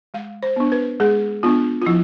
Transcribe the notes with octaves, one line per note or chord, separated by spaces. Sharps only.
G#3 F5
C5
B3 D4
B4
G#3 G#4
B3 D4 F4
F4
F3 E4